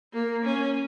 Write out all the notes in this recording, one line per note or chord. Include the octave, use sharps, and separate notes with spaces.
A#3
C#4